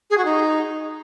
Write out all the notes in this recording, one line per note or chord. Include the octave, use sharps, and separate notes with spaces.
G#4
F#4
D#4